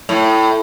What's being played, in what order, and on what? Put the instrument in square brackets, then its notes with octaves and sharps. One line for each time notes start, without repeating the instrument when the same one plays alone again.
[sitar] A2